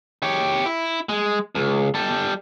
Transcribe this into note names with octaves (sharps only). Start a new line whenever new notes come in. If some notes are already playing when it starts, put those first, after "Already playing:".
G4 C#5
E4
G#3
C#2
G3 A4